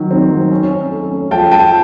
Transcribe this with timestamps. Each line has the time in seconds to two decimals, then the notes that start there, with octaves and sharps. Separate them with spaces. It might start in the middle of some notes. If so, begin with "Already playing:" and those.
Already playing: D#3 F#3
0.11 C4
0.31 F#3
0.51 C#4
0.71 C#4
0.91 A3
1.11 C#4
1.31 F3 G5 A5
1.51 F3 G5 A5